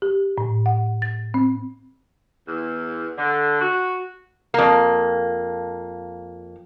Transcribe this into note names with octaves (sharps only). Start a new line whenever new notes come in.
G4
A2
F#5
A6
C4
E2
D3
F#4
F2 A#3